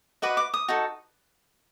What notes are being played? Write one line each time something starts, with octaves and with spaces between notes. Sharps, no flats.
F#4 B4 D#5 D6
D6
D#6
D#4 F#4 A4